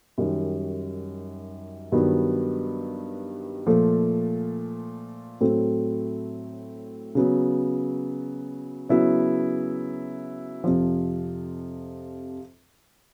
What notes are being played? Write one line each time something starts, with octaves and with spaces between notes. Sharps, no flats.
F#2 D#3 G3
G2 D#3 F#3 B3
A#2 F3 A3
A2 F#3 A3 C4
C#3 F#3 B3
C#3 F#3 B3 E4
F2 C3 F3